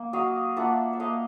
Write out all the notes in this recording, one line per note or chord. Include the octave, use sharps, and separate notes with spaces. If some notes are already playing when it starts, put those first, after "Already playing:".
Already playing: A#3
F#3 D#5 F5
A#3 D4 F4 E5 F#5
E5
A#3 D#5 F5